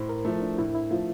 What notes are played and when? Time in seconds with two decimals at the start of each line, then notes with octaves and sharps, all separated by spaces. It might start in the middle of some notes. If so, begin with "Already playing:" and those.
Already playing: A2 C5
0.09 A#4
0.25 F3 A3 E4
0.42 D4
0.58 A2 E4
0.75 E4
0.91 F3 A3 F4